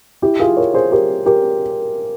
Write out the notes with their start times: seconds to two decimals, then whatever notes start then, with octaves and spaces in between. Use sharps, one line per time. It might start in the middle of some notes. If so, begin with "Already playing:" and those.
0.22 E4 G4
0.40 F4 G#4
0.57 A#4 C#5
0.74 G#4 C5
0.92 G4 A#4
1.26 G4 A#4